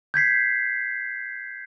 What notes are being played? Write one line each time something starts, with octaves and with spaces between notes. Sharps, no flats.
G6 G#6 B6 C7